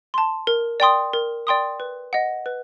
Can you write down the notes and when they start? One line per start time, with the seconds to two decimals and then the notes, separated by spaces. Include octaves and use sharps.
0.14 A5 C6
0.47 A#4
0.80 D5 G5 C6 D#6
1.13 A#4
1.47 D5 G5 C6 D#6
1.80 B4
2.13 D#5 F#5
2.46 B4